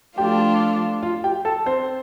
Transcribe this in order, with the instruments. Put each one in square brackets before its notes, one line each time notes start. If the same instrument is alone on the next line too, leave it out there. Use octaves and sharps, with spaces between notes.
[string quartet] F3 A3 D4 F4 A4 [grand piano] G4 G5
[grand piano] F4 F5
G4 G5
A4 A5
C4 C5